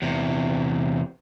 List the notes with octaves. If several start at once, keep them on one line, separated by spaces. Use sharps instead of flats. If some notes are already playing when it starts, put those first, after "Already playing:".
E2 C3